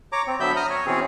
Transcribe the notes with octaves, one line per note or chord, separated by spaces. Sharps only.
C#5 A#5 D6
C4
D3 F#3 B3 E5 B5 G6
A#5 D#6 F6
C#5
B2 E3 C4 C#4 G#4